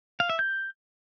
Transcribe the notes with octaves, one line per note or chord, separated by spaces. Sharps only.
F5
E5
G6